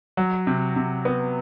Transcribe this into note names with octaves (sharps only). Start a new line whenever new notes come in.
F#3
C3
C3
B3